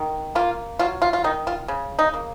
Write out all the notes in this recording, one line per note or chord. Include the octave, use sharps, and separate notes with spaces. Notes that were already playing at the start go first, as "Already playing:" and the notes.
Already playing: D#3
A#3 F4
F#3 F4
F4
F4
D#3 D#4
F4
C#3
D#4
A#3